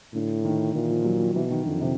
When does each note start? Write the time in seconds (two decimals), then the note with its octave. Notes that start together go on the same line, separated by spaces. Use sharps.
0.14 A2 D3
0.45 D#3
0.75 A#2 E3
0.90 F3
1.05 F#3
1.20 F3
1.35 B2 E3
1.51 D#3
1.65 F2 D3
1.81 C3